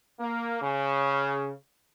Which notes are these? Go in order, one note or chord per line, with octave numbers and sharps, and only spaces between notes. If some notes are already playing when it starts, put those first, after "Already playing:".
A#3
C#3